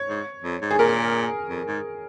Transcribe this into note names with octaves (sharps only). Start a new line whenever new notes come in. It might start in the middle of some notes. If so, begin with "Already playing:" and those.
Already playing: C#5
G#2
F2
G#2
G#4
A#2 A#4
F2
G#2